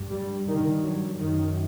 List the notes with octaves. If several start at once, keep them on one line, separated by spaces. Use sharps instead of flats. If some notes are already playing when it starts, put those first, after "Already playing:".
Already playing: G2
G3
G2 D#3
F#3
F#2 D#3